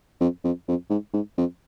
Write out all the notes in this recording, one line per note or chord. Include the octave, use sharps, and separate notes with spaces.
F2
F2
F2
G#2
G#2
F2